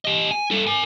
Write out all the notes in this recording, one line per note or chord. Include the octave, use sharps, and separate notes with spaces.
G4 D#5
G#5
G3 A4
A#4 G#5